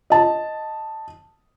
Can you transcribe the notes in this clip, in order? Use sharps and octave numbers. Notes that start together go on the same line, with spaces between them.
D#5 A5